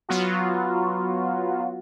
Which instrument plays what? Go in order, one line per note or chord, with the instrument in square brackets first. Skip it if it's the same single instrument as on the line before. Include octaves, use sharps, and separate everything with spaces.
[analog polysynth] F#3 B3 F4 F#4